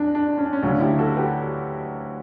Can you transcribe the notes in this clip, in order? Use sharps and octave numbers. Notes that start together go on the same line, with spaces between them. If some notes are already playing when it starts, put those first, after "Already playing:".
Already playing: E2 D4
D4
C#4
D4
C#4
D2 C#3 F#3 D4
E4 G4
F#4 A4
G4 B4